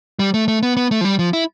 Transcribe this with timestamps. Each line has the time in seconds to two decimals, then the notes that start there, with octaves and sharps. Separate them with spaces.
0.19 G3
0.34 A3
0.48 A3
0.63 B3
0.77 B3
0.91 A3
1.01 F3
1.05 G3
1.19 F3
1.33 E4